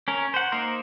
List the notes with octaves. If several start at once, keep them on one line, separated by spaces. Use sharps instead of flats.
C#4 A#4
C5 F#5
A#3 D#4 A#4 C5